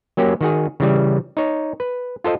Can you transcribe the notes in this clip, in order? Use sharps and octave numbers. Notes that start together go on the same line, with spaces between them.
F#3 A#3 C#4 G4
D#3 F#4 G#4
C#3 E3 G3
D#4 C#5
B4
F4 A4 C5 D#5